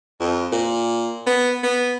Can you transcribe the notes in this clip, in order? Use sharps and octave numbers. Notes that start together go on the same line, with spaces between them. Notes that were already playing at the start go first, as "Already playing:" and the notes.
F2
A#2
B3
B3